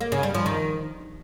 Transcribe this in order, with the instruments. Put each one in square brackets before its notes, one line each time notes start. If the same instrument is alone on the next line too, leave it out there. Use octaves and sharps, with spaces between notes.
[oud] A#3
C#3
G3
F3
D#3